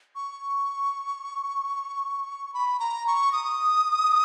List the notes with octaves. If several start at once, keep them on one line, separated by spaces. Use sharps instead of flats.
C#6
B5
A#5
C#6
D#6